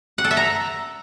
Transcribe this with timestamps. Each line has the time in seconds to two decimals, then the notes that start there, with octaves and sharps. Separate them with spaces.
0.18 F#5
0.24 A4
0.31 E5
0.37 A#5